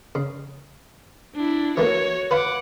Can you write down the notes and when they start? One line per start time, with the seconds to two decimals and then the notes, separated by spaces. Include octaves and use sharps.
0.15 C#3
1.35 D4 E4
1.77 E3 A3 A#3 F#4 C#5
2.31 B4 F5 F#5 B5 D6